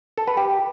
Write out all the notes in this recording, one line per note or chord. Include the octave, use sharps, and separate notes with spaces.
A4
B4
G4